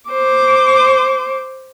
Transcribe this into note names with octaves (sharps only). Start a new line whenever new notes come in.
C5 D6